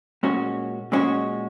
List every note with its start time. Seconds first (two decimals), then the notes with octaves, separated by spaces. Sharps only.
0.23 A#2 G#3 C#4 F#4 C#5
0.92 A#2 G#3 C#4 F#4 C#5